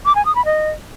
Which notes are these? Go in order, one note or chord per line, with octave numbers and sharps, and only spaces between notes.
D6
G#5
D#6
B5
D#5